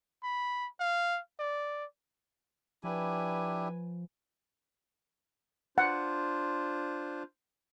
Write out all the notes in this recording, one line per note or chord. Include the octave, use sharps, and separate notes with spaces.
B5
F5
D5
F3 D4 E4 G4 B4 G#5
D4 F4 C5 F#5